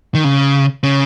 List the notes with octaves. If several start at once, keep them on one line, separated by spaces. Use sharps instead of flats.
D#3
C#3
C#3